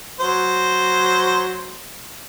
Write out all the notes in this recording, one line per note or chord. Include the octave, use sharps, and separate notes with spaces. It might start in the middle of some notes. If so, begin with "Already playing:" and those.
F#3 C5